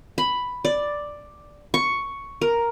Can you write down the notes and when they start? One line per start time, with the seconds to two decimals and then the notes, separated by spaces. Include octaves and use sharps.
0.18 B5
0.65 D5
1.74 C#6
2.42 A#4